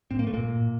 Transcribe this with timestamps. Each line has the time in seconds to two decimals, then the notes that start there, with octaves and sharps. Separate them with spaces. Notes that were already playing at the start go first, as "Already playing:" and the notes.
0.11 A2 C4
0.19 A#3
0.26 A2 A3
0.34 A#2 A#3
0.42 A2
0.57 A2